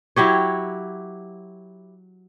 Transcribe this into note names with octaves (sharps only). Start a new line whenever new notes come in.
F#3 E4 G4 C#5